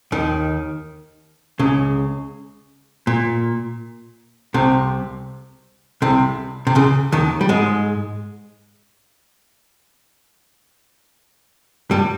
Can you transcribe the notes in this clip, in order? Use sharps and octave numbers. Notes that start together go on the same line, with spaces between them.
D#2 D#3
C#2 C#3
A#2
C2 C3
C2 C3
C3
C#2 C#3
D#2 D#3
G3
G#2 G#3
G2 G3